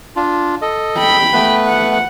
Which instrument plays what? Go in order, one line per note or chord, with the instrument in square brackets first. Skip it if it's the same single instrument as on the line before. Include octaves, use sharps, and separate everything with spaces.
[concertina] D4 F4
A4 D#5
[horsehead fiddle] G5 B5
[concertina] A3 B3 B4
[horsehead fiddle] F#5